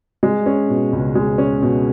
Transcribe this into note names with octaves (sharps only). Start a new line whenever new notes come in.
G#3
C#4
B2
C#2
G#3
C#4
B2